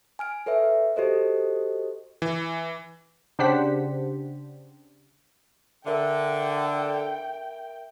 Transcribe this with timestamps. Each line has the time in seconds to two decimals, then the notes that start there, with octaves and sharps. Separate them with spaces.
0.19 G#5 F6 D7
0.46 A4 B4 C#5 E5
0.96 F#4 G4 A4 C5 D#5
2.22 E3
3.39 C#3 D4 G4 C5 F#5 B6
5.87 D3 A#4 E5 G5